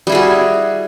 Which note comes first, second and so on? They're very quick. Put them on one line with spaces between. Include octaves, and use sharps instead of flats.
G3 E4 G#4 F#4